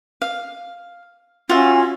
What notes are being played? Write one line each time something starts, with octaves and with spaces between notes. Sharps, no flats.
F5
C#4 F4 F#4 E5